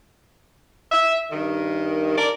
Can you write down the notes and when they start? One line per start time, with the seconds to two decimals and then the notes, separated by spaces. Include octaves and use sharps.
0.91 E5
1.31 G2 D#3
2.16 A#4 D5